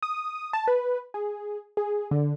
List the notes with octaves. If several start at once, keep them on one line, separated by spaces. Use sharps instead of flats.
D#6
A5
B4
G#4
G#4
D3